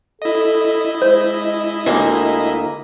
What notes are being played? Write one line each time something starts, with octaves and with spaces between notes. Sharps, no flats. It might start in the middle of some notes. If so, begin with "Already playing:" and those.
E4 A4 D#5
G#3 C5
D2 A#3